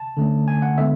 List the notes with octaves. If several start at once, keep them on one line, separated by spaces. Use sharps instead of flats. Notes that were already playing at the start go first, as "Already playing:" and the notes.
Already playing: A5
D3 A3 C#4
G#5
F#5
D3 G#3 B3 D4 E5